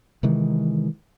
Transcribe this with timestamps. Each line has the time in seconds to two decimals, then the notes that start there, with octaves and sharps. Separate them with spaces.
0.23 C3 D#3 E3 G#3